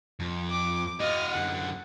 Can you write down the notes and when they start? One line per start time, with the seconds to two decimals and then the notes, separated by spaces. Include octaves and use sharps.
0.20 F2
0.51 D6
1.00 F#4 D#5 F5 F6
1.34 F#2 D3 F#5